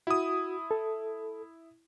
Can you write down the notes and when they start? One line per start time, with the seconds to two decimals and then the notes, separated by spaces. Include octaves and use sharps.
0.07 E4 F#4 D#6
0.71 A4